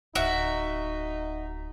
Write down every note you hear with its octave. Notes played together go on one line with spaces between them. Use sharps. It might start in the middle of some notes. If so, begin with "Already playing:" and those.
D1 D#4 F#4 E5